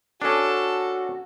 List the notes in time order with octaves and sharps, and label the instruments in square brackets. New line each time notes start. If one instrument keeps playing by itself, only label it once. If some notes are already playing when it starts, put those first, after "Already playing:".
[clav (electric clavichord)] C#4 D4 [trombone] F#4 [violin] A4